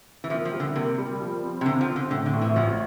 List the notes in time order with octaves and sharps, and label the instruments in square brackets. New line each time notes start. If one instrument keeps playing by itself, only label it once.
[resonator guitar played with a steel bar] E3
[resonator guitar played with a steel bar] F3 [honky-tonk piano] A#3
[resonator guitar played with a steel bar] F3
[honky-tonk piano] G3
[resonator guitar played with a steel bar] D3
[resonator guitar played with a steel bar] C3 [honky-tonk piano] A#3
[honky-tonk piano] G3
F3
C4
[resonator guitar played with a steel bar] C3
[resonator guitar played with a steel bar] D3 [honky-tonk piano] C4
[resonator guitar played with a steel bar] F3
[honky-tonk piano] C4
[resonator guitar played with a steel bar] D3
[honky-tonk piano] A2 [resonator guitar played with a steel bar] D3
[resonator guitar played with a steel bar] D3
[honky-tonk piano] A2
[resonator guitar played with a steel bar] E3
[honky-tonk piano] A1 [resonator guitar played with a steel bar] F3